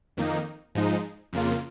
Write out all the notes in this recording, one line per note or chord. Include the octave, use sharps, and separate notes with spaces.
F2 D#3 A#3 D#4
G#2 F3 G#3 D#4
F2 C#3 A#3 F4